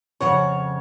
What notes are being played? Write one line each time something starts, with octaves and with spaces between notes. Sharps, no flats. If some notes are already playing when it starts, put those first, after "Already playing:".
F2 C#3 C#5 F#5